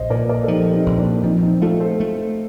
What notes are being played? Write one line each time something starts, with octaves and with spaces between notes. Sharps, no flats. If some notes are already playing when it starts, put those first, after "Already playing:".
Already playing: A#1 C5 D#5
A#2 A#4 D5
A#4 D5
A4
F3 D#4 G4
C4 D#4
A#1
A#3 D4
F3 C4 D#4
C4 D#4
A3 F4 A4
A4 C5
A3